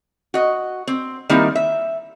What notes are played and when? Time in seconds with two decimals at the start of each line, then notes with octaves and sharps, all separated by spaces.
0.34 F#4 D#5
0.88 C4
1.29 D#3 G3 A#3 C4 D#4 E4
1.55 E5